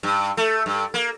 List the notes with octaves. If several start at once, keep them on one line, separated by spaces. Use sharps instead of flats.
G2
A3
G2
A#3